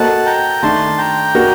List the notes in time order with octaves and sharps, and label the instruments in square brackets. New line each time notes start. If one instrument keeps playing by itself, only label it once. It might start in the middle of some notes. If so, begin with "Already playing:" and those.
Already playing: [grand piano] A#3 F#4 A4 C5 D#5 [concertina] F#5 A5
[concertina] G5 A#5
[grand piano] D#3 A3 D4 [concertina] A5 C6
[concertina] G5 A#5
[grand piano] A#3 D4 F#4 A#4